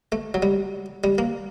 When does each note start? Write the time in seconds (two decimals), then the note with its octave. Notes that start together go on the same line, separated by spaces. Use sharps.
0.12 A3
0.34 F#3
0.42 G3
1.04 G3
1.18 A#3